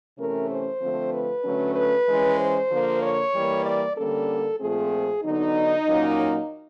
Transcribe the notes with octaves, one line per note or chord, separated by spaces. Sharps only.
C3 E3 A3 C#4 A#4
C5
D3 F3 A3 C4
B4
D3 F#3 A3 C#4
B4
E3 G#3 C#4
C5
D3 F3 A#3
C#5
E3 G3 A#3
D5
D3 G3 A#3 C#4 A4
A#2 F3 A3 C4 G#4
D3 F#3 B3 D#4
A#2 F#3 A#3 C#4